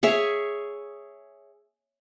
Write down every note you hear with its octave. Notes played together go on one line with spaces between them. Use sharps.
G#4 C#5 E5